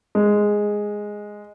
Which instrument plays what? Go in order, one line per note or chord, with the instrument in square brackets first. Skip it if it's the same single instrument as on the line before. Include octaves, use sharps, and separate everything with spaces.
[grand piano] G#3